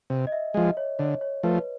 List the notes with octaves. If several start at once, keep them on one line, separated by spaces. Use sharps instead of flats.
C3
D#5
E5
F3 G#3 D#5
C#5
D3 C#5
C#5
F3 A3 B4